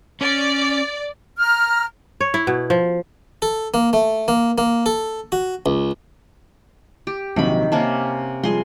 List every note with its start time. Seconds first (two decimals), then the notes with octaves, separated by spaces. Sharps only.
0.21 C#4 D5
1.38 A#5 F6
2.21 C#5
2.34 E4
2.47 B2
2.70 F3
3.42 A4
3.74 A#3
3.93 A3
4.28 A#3
4.58 A#3
4.86 A4
5.32 F#4
5.66 C#2
7.07 G4
7.36 A#1 C3 D#3 F#3 B5
7.72 C3 A#3 C#4 A5
8.43 F3 G3 G#4 C6